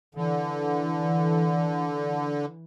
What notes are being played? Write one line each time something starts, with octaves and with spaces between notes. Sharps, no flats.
D3 E3